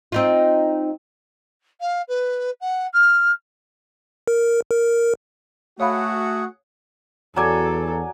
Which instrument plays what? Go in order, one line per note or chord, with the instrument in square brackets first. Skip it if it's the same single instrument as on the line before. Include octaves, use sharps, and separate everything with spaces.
[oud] C4 D#4 F4
[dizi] F5
B4
F#5
F6
[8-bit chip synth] A#4
A#4
[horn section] A3 F#4 [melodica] G#4 F#5 [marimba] C#5 F5 B5
[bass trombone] E2 [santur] F#3 D5 G#5 [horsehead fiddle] A4 [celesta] A#5 D6 G#6